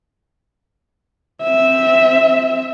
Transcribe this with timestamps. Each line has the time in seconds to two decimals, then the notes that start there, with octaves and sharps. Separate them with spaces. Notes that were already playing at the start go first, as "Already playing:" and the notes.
1.43 C4 E5